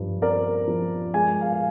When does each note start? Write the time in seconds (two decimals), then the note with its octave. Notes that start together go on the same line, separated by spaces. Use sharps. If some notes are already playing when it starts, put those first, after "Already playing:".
Already playing: G2 F3
0.22 C4 A#4 D5
0.67 F3
1.13 G#3 G#5
1.41 F5 G#5
1.52 F5